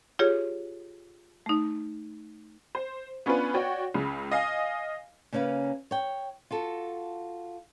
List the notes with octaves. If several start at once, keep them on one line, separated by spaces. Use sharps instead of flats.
F4 G4 G#4 C#5
A3 D#4
C5
B3 C#4 D4 F4 B4
F#4 C#5 D5 G5
C#2 C#3
D#5 F5 G#5
C#3 A#3 C#4 B4 F5
C#5 G5
F4 F#4 A4